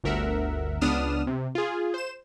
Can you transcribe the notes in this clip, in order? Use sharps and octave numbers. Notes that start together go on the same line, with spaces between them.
G1 D2 A#4 E5 F#5
C#2 B3 D4 D#6 F6 E7
C3
F4 G#4
C5 E7